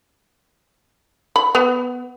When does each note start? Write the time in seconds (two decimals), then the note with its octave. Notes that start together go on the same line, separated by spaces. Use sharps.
1.36 B5
1.55 B3